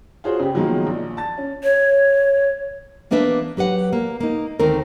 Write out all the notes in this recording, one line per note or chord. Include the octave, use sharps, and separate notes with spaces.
F4 F#4 G#4 C5 C#5
C#3 G4
B2 D#3 F3 F#3 G#3 A#3
A#1
A5 A6
C#4
C#5
E3 A#3 B3 D4 B4 E5
F#3 G4 B4 F#5
A#3
A#3 D#4
D2 D#3 A3 C4 A#4